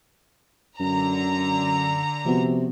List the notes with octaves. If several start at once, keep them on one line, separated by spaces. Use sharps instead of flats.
F#2 D3 A#5
C3 F3 B3 F#4